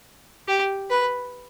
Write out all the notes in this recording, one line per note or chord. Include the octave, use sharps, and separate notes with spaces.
G4
B4